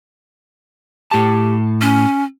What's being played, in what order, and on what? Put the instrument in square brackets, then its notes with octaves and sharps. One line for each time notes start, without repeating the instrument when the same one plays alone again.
[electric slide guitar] A2 A5 [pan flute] G4
[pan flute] C#4